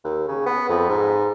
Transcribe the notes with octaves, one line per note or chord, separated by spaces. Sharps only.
D#2
C#3
B3
F2
G#2